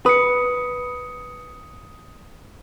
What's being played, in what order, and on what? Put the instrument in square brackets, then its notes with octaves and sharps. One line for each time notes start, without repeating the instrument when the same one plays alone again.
[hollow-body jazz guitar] B4 [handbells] D#6 C#7